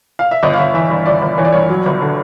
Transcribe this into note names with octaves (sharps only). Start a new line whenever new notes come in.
F5
E5
G1 D#5
F5
G1 E5
E3 E5
G2
G1 D5
G1
E3 C#5
D5
G2 C#5
F#3
G1
D3